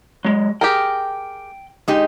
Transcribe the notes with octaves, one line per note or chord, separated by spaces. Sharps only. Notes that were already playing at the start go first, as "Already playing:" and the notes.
F#3 G#3
G4 G#4 A#4 G5
G#3 D#4 G4